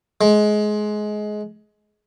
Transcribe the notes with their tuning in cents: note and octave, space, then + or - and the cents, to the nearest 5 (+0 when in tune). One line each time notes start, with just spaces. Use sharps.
G#3 +20